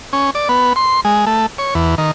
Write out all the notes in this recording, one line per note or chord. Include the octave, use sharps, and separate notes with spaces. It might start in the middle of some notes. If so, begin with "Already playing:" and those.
C#4
D5
B3
C6
G#3
A3
C#5
E2
D#3